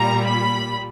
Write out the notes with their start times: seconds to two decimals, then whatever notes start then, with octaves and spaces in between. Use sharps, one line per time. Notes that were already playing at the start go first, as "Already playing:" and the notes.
Already playing: A#2 G3 A#5
0.26 B5